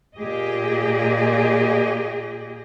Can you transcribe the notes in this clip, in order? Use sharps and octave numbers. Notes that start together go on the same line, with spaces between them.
A#2 G4 G#4 D#5